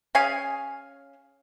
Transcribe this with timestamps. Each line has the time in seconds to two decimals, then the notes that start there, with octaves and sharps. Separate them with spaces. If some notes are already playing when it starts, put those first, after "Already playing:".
0.15 C#4 G#4 F5 G#5